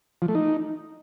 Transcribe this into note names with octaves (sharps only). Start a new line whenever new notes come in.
F3
A3
D#4